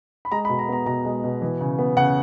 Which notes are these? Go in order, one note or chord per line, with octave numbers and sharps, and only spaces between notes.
B5
G#3 A#5
B5
B2
A#5
B3 A#5
B2 A#5
G#3
B2
E3
C#3
B3
C#3 F#5